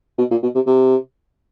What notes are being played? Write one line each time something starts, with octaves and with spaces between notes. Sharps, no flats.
B2
A#2
B2
C3
C3